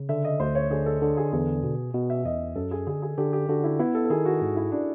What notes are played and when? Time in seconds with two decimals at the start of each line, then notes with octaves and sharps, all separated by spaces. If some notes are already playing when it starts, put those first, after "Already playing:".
Already playing: C#3
0.09 D3 E5
0.25 D#5
0.40 D2 C5
0.55 C#5
0.71 D3 G#4
0.86 A4
1.02 D3
1.17 G#4
1.32 E2 G#4
1.63 B2
1.94 B2
2.10 E5
2.25 E2 D#5
2.56 F#2 A4
2.71 G#4
2.87 D3 G#4
3.02 G#4
3.18 D3 G4
3.33 G4
3.49 D3 F#4
3.64 E4
3.79 B3 E4
3.95 A4
4.05 A4
4.10 D#3 G#4
4.26 F#4
4.41 G#2
4.57 E4
4.72 D4